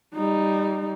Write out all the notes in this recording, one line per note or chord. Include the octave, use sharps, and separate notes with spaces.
G3 D#4